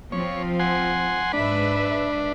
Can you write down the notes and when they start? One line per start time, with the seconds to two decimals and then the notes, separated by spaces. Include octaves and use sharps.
0.12 F3 C4 F4 C#5
0.60 F#5 G#5 C6
1.33 G#2 D4 B4 E5